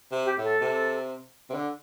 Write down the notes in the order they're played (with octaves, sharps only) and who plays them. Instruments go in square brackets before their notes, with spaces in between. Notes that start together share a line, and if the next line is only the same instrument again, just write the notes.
[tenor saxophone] C3
[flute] G4
[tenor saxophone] A2
[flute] A4
[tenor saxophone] C3
C3
D3